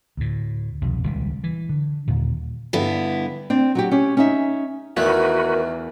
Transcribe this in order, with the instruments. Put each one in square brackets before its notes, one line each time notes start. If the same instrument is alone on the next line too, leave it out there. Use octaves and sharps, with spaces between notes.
[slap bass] D2 A2
C2 F2 B2
D#1 C#2 D#3 G3
E3
D3
D#2 A#2
[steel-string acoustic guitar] G2 D3 B3 E4
[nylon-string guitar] C4 D4
F#3 F#4 G4
C#4 G4
C#4 D#4 E5
[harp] E2 F#6 [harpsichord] D#3 A3 A#3 [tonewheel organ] F#4 B4 [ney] A#4